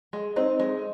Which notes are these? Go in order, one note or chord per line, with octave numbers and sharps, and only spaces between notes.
G#3
C4 D#4
G#3